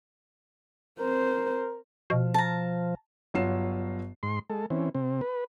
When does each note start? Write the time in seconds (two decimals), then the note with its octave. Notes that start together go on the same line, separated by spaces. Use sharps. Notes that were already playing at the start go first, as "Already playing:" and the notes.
0.99 C4 A#4 C5
2.10 B2 F3
2.34 A5 A#5
3.34 G1 F#3 F4 C7 E7
4.23 G#2 C6
4.50 G#3 A4
4.70 E3 C4 C#4
4.95 C3 C4
5.21 B4